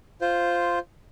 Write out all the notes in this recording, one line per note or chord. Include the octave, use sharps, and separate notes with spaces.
F4 C5